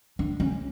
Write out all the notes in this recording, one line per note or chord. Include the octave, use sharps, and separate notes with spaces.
D4
C#4